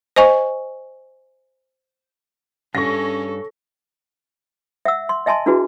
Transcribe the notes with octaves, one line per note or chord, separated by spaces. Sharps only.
C5 D#5 G#5 C#6
G2 C#4 A4 C#6 A#6
E5 F#5 E6
C6
D#5 E5 G#5 A5 C6
D4 E4 F#4 G#4 B4